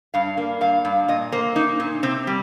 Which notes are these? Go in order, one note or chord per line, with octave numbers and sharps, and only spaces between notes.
G2 F5
A#3
G2 F5
G2
A#2 D#5
A#3 C5
A#3 D#4
A#2 D#4
C3 C4
G3